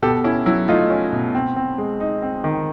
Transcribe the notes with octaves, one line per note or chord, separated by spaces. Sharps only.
B2 G4 A4
C#4 E4
F#3 E4
A3 D#4 F4
C#4
B2
C4
C4
G#3
D#4
C4
D#3